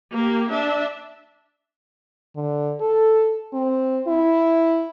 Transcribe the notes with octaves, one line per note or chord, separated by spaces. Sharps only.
A#3 G4
D4 E5
D3
A4
C4
E4